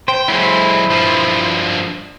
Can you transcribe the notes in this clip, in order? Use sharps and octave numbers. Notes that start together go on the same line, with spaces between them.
C5 G5
F#3 G#3 E4 C5
G2 F3